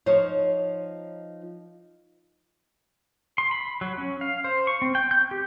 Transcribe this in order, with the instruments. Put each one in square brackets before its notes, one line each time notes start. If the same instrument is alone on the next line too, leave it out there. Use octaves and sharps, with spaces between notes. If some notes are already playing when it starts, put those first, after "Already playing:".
[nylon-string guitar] F3 D#4 C5 C#5
[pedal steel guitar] C6
B5
F#3
C#4
F5
C5
C#6
C4
G5
G6
G4